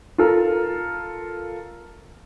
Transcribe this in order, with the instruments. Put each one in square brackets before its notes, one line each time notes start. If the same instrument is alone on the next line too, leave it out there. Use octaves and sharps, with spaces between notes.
[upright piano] F4 A4 A#4